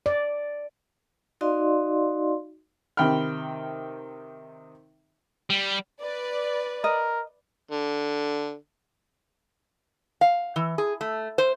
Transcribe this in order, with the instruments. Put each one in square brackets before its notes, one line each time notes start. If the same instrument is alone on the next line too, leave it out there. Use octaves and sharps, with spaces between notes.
[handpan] D5
[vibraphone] D#4 F#4 D5 D#5 F5 C6
[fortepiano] C3 D#3 G5 B5 F6
[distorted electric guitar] G3
[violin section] B4 D5
[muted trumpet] A#4 [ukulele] D#5
[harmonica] D3
[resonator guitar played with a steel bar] F5
E3
G#4
A3
C5